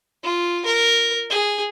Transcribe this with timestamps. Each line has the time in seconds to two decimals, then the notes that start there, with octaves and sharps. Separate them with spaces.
0.24 F4
0.66 A#4
1.31 G#4